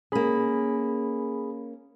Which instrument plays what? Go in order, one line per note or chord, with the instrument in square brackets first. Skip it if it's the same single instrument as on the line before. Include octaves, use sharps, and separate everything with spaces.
[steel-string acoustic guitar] A#3 C#4 [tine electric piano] G#4 B5